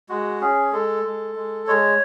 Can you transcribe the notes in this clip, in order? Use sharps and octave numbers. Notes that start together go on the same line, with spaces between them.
G#3 F#4
C#4 G#4
G#3 A4
G#3
G#3
G#3 C#5